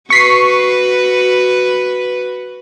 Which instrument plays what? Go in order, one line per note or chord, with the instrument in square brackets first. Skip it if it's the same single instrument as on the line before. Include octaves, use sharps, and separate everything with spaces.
[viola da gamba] F#4 B4 [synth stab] C#6 B6 C7